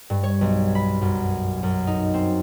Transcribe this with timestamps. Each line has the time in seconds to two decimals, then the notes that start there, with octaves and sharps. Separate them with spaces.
0.10 G2
0.23 C#5
0.41 B1
0.75 B5
1.02 F#2
1.63 F#2
1.87 D#4
2.14 C4